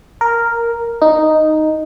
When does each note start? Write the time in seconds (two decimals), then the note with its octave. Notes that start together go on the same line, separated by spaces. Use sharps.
0.21 A#4
1.02 D#4